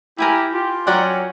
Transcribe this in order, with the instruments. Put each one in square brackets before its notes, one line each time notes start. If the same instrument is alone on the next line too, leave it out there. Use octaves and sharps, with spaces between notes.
[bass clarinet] E4 [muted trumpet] G4 [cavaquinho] A#4 G#5 B5
[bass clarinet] F4 [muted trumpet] G4
[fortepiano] F#3 D5 F#6 [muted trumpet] C#4 [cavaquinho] A#4 F#5 G5